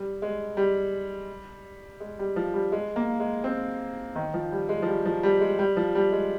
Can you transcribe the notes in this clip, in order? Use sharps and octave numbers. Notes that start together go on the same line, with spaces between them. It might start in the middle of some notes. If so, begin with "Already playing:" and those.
Already playing: G3
G#3
G3
G#3
G3
F3
G3
G#3
A#3
G#3
C4
D#3
F3
G3
G#3
F3
G3
F3
G3
G#3
G3
F3
G3
G#3